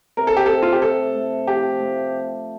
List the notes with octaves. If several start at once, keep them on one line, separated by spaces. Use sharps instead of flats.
C3 A#4
A4
G4
C3 A4
F4
G4
A3 A4
A3
F3 G4
A3